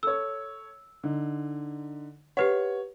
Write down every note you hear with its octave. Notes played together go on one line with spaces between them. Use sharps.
A4 C#5 E6
D3 D#4
G4 B4 C#5 F#5